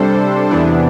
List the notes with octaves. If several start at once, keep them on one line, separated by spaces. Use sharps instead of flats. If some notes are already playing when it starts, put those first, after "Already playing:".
Already playing: C3 G3 D4 A4 C5
E2 C3 E3 B3 D4